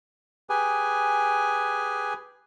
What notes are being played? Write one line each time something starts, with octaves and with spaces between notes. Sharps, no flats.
G4 G#4 B4 G#5